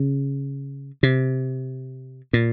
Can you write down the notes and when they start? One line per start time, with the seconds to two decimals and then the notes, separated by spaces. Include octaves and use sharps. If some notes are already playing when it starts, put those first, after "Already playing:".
Already playing: C#3
1.03 C3
2.33 A#2